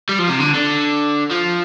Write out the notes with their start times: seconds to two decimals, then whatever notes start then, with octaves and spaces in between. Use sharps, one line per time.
0.09 G3
0.19 F3
0.29 C3
0.40 D3
0.54 D3
1.31 F3